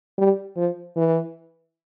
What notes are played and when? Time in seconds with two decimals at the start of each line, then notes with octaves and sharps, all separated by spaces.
0.18 G3
0.57 F3
0.97 E3